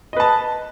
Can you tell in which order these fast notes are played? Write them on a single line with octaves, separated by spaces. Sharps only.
D#5 B4 A5